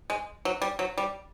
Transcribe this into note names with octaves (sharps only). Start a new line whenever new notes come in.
G#3
F#3
G3
F#3
G3